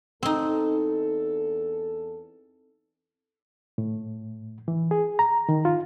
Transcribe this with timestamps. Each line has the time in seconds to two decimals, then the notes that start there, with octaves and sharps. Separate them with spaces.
0.23 E2 C4 D#4 A4
3.78 A2
4.68 E3
4.91 G#4
5.19 A#5
5.49 D#3
5.65 F4